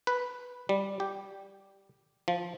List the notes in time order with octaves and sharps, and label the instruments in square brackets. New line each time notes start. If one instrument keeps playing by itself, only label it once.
[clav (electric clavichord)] B4
G3
G4
F3